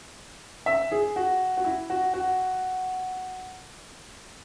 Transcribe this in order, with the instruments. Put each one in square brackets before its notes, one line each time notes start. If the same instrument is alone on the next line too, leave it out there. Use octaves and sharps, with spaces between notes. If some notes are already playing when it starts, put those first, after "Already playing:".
[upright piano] E5
G#4
F#4
F#4
E4
F#4
F#4